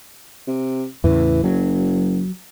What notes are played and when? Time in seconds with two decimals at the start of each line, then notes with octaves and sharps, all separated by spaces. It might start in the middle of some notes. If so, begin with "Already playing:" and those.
0.47 C3
1.04 E2 A2 C#3 E3
1.44 F#1 F#3